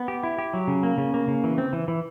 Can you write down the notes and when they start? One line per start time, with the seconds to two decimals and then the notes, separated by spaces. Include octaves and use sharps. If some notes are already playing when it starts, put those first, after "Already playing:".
Already playing: B3
0.08 G4
0.23 E4
0.39 G4
0.54 F#3
0.68 C#3
0.83 A#3
0.98 C#3
1.14 A#3
1.28 C#3
1.44 E3
1.58 C4
1.73 E3
1.88 E3